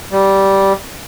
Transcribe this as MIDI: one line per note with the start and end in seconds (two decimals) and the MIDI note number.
0.12 0.73 55